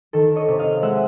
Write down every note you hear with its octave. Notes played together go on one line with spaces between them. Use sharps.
D#3 A4
C#5 D#5
C3
D#5 F5
G#3 E5 F#5